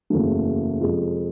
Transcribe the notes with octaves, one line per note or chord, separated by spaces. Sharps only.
F#1 E2 C#3 F#3 A3
F2 C3 F3 G#3